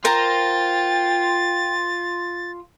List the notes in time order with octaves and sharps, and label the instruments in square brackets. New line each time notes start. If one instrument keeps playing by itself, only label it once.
[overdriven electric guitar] F4 [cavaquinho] A#4 C5 A#5 [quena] G5 [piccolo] A6